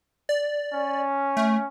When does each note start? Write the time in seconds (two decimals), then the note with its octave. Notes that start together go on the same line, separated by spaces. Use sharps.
0.29 D5
0.73 C#4
1.37 A3